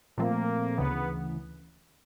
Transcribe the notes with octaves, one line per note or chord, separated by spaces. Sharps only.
A#2 F3 A3 A#3 C4
D2 C#3 E3 B3